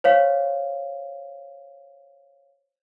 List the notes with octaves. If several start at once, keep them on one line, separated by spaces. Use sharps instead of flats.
C5 C#5 F5